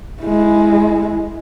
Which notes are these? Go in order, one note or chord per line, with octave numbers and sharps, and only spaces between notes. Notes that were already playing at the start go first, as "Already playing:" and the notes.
G#3 E4